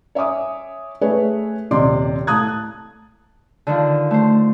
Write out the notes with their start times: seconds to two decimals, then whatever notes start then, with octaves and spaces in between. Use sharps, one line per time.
0.15 C#5 E5 G#5 D6 D#6
1.01 A3 G#4 B4 C#5 E5
1.71 D#1 C3 D5 D#5 C6 D6
2.27 A2 A5 D#6 F#6 G#6
3.67 D3 D#3 F3
4.11 A3 C5